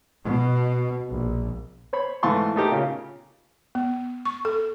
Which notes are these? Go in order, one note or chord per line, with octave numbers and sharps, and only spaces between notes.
B2
A#1
C5 C#5 B5
G#2 E3 A3 F5 C6 C#6
A3 D#4 G4 A#4
A#2 C#3
B3
C#6
A4